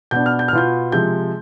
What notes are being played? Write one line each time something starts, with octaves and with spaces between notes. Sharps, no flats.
B2 B3 D4 G6
F6
G6
F6
B2 B3 F4 G6
C3 F3 G#3 G6